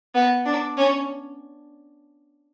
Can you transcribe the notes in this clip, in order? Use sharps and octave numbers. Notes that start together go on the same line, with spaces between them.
B3
D4
C#4